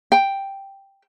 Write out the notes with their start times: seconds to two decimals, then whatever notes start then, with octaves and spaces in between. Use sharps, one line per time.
0.12 G5